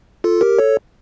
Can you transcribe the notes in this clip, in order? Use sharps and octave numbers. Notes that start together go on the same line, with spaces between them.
F4 A4
G4 A#4
A4 C#5